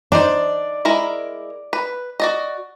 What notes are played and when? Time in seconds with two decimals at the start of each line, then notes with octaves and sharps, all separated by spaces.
0.12 D4 D#4 C5 D5
0.85 G#3 E4 A#4
1.73 B4
2.20 F#4 D5 D#5